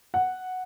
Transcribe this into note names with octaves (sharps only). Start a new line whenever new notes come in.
F#5